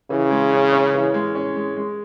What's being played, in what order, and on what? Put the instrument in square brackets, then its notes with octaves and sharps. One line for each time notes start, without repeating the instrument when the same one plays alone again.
[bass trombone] C#3 [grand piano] E3
[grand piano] G#3
C#4
C#4
E3
G#3
C#4
G#3
G#3